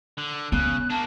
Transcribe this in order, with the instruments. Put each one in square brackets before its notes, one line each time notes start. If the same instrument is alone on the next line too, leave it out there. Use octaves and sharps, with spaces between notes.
[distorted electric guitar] D3
[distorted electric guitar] C#3 [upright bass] B3 [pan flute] F#6
[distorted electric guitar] A#3 D4 [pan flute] A5